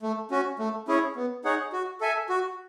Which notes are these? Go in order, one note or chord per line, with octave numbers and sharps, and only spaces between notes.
A3
C#4 F#4
A3
C#4 E4 G#4 C#5
B3
D#4 G#4 C#5 F#5
F#4
A4 E5 G#5
F#4